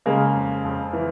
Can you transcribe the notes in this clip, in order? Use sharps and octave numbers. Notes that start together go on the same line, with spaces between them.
C#3 G#3 A#3
F2
F2
E3